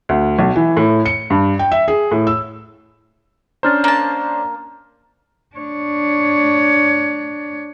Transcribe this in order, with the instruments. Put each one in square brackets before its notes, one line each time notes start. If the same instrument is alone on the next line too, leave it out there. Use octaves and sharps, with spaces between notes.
[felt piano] D2
B1
E3
A2
C#7
G2
G5
E5
G#4
A2
E6
[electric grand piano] C#4 D4 C5 [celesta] A#5 F6 A6
[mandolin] A#3 A5
[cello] D4 C#5